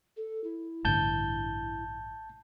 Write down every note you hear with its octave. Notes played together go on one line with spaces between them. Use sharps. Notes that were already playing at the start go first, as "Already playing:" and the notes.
A4
E4
A1 G2 D3 A5 G6